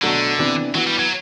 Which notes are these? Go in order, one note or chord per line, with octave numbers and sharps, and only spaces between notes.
B2 D3 F#3 A3 D4 F#4
C3 E3 B3 D4
E3 F#3 B3 F#4
G3
F#3